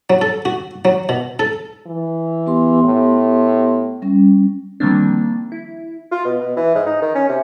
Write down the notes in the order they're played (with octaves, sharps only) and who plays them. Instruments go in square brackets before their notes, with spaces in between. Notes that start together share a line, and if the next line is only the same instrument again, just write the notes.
[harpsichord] F#3
A4
F#4
F#3
B2
A4
[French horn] E3
[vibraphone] B3 G4 C6
[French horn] A2
[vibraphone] G3 C#4
[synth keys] D#3 F3 G3 A#3 C4 D4
E4
[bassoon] F4
B2
B2
E3
G#2
D#4
D#3
C#4
C3